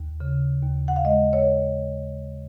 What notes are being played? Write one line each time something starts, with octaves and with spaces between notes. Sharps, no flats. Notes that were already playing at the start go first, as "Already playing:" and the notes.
Already playing: D#2
C#3
D#2
F#5
F5
G#3 D#5
C#5